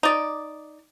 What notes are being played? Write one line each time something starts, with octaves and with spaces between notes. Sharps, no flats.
D#4 D5